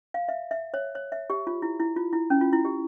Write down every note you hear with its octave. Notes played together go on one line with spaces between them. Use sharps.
F5
E5
E5
C#5
C#5
E5
G4
F4
E4
E4
F4
E4
C#4
F4
E4
G4